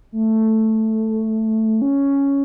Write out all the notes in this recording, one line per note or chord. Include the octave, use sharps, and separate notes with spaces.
A3
C#4